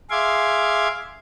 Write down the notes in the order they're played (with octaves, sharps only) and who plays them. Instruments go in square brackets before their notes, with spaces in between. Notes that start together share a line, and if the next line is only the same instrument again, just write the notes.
[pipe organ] G#4 E5 F5 C6 D6 G#6